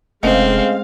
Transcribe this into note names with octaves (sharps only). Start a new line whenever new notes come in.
F1 C#2 G#2 G#3 A3 C4 F5